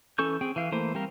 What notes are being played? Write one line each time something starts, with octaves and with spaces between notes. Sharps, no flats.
E3 C#4 A4 C#6 G6
C4 G#4 G5
E3 F5
E3 A3 A#3 C5
G3 C4 G4 A#4 F5